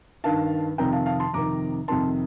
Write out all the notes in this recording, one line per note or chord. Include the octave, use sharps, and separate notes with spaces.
G2 D#3 F5 A5
F2 C3 D#3 G5 A#5
F5 A5
F5 A5
A5 C6
F2 C3 D#3 A#5 D6
F2 C3 D#3 A5 C6